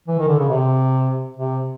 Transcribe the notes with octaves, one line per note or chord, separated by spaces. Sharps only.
E3
D#3
D3
C#3
C3
C3